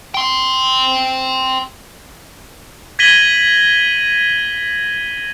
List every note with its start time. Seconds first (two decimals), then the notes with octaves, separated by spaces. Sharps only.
0.14 G5 C6
2.99 G#6 A#6 B6 D#7 F#7 G7